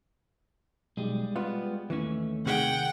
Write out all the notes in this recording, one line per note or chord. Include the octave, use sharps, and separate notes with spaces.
B1 G3 G#3
B3 F4
D#2 E3 A3 C#4
C3 D#3 G#4 F#5 G5